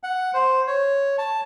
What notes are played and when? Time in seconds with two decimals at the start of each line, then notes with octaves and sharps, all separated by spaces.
0.03 F#5
0.34 C5
0.67 C#5
1.18 A5